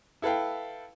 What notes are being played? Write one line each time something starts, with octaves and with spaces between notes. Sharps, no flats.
E4 A4 B4 F5 G5